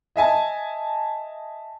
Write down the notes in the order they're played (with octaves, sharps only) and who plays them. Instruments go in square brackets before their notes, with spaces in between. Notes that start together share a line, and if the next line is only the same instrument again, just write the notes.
[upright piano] D#5 E5 G#5 A5